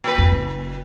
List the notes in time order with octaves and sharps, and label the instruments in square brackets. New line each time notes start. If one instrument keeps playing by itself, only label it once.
[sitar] A#2 B4
[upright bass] F2
F#1